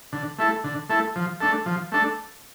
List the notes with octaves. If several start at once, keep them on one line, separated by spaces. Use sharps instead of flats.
D3
A3 E4 A4
D3
A3 E4 A4
F3
A3 D4 A4
F3
A3 D4 A4